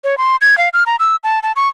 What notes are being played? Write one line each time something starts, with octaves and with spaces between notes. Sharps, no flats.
C#5
C6
G#6
F5
F6
A#5
E6
A5
A5
C#6